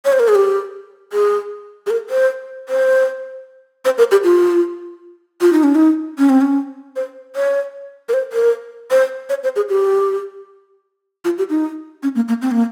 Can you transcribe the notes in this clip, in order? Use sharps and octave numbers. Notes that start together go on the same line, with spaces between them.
C#5
C5
A#4
G#4
G4
G#4
G#4
A#4
C5
C5
C5
A#4
G4
F4
F4
D#4
C#4
D#4
C#4
C4
C#4
C5
C#5
A#4
C5
A#4
C5
C#5
C5
G#4
G4
F4
G4
D#4
C#4
A#3
A#3
C4
A#3